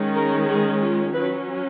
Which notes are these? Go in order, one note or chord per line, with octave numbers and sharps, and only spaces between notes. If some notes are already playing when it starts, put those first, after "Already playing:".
Already playing: D#3 G#3 C#4
A#4
G#4
F4
F#3 C#4 B4